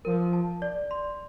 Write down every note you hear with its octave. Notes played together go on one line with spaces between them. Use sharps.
F3 A#4
A5
D5
C6